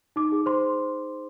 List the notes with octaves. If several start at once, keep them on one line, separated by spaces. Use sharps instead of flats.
D#4 D6
G#4
C5 C6